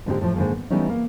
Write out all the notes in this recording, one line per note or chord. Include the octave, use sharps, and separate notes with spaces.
G#2 D3 B3 C4 D#4 G4
A2 F3
G#2 D3 D#3 A3 A#3
B3
E3 G3 A3 B3 C#4 D#4
A#3